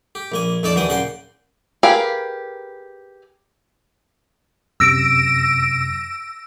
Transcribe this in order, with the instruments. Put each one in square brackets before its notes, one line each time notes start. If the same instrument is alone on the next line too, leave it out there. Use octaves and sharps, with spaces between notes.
[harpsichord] G4
A#1 A#3 G#5
F2 F3 D#4 C#5 D5 A5
D#2 E3 F#3 D4 G5 D#6
A#2 C#3 F#5 G5 C6
[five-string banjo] G4 G#4 A#4 B4 F5
[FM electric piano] F#2 C3 [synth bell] E6 A#6 D7